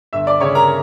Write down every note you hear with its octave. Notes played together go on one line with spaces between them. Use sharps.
G1 E5 E6
D5 D6
C#3 C#5 C#6
A#4 A#5